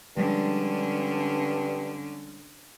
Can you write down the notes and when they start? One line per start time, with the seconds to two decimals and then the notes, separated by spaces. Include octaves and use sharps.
0.17 G2 D3 F3 G3 G#3 C#4